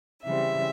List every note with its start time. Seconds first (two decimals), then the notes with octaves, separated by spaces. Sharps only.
0.24 C#3 E3 G3 C4 E5